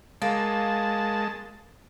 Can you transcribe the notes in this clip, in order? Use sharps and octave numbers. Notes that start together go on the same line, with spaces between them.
G#3 A#3 A5